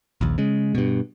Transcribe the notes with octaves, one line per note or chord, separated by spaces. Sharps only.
A#1 D#2
C#3 G#3
G2 B2